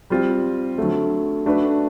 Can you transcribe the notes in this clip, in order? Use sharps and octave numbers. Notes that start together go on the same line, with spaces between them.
G3 C4 F4
D3 F#3 A3
A3 D4 F#4 B4